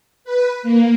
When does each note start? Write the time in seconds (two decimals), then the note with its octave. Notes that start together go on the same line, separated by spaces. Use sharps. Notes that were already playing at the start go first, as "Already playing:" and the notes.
0.24 B4
0.63 A#3